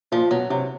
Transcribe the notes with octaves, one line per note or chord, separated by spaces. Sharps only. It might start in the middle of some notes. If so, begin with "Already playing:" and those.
A#2 F3
B2 F#3
C3 F#3